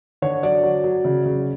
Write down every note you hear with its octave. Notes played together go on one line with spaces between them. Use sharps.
D3 C#5
F#3 D5
F#3
F#3
C#3
C#3